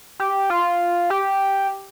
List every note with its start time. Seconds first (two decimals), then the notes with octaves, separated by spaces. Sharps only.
0.20 G4
0.50 F4
1.10 G4